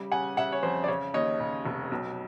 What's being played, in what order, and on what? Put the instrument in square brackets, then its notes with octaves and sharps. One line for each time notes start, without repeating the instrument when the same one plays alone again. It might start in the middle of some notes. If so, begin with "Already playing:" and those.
Already playing: [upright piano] C#3 G3
C#3 F#5 G#5
C#3 E5 F#5
C#5
F2 C5
D5
C#3 C#5
D#2 C#5 D#5
C#3
F1
B1